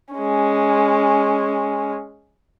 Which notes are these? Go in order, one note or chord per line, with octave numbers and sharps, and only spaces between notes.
G#3 C#4